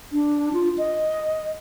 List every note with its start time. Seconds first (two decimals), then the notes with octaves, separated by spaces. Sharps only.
0.13 D4
0.53 F4
0.78 D#5